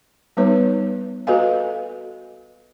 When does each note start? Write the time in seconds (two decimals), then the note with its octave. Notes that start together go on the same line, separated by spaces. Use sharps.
0.37 G3 B3 D#4 B4 C#5
1.27 F#4 A4 B4 D#5 F5 G#5